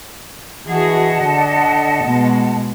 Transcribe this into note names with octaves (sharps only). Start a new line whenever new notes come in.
E3 F#4 G#4 D#5 F#5 A5
D3
B2 G#3